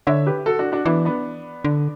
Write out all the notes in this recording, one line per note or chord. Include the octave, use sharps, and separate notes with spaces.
D3 C#5 E5
G4 B4
F#4 A4
D4 F#4
D4 F#4
E3 B3 D4
B3 D4
D3